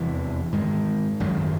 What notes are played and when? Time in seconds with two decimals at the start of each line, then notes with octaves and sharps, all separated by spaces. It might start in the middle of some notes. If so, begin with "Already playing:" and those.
Already playing: F1 E2 C3 E3
0.52 G#2 D#3 G#3
1.20 G#1 F#2 D#3 F#3